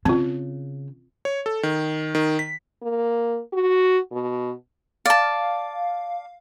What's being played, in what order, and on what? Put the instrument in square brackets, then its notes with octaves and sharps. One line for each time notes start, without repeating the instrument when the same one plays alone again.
[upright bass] C#3 [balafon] C4 F4
[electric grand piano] C#5
A4
D#3
D#3
B6
[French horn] A#3
F#4
B2
[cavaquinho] D5 A5 [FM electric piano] F5